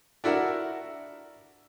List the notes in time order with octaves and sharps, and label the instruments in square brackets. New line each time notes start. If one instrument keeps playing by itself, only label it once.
[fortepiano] D4 E4 F#4 A#4